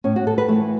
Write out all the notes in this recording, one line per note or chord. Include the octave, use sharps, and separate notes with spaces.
A2 C#4
F#4
A2 A4
B4
E3 A3